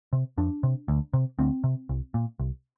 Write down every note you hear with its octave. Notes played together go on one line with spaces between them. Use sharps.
C3
F2 D4
C3
D2
C3
D2 C4
C3
C2
A#2
C2